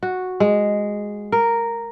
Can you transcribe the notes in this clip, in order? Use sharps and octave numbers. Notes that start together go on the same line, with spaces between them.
F#4
G#3
A#4